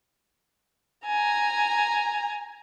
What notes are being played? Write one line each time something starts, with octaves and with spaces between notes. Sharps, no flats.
G#5 A#5